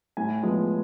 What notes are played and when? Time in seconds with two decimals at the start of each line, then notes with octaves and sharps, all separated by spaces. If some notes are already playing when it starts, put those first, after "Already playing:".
0.17 A2 G#5
0.43 F3 G#3 B3